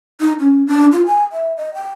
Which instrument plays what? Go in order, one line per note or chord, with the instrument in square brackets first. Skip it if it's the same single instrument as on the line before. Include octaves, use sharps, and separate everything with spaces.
[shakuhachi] D#4
C#4
D4
F4
G#5
E5
D#5
G5